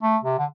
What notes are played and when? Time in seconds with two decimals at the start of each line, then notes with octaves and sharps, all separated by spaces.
0.03 A3
0.24 C3
0.39 D3